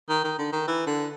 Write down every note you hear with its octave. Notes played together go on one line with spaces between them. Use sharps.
D#3
D#3
D3
D#3
E3
D3